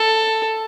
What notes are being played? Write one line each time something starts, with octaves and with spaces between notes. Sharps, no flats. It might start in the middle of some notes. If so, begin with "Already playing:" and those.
Already playing: A4